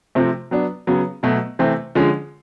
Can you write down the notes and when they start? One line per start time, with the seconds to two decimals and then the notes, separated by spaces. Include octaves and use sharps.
0.15 C3 F3 A3 C4
0.51 F#3 B3 D4
0.87 C#3 F#3 B3
1.23 B2 F#3 A3
1.59 C3 E3 A3 C4
1.95 D3 F3 G#3 C#4